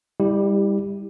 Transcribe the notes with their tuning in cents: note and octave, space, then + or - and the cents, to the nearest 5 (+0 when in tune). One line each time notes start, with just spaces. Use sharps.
G3 +25 E4 -15 G4 +0